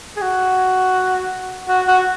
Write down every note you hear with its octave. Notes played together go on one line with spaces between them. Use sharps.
G#4
F#4
F#4
F#4